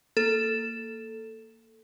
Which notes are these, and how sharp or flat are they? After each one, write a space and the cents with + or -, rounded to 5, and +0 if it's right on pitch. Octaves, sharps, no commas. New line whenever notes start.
A#3 -15 A4 +0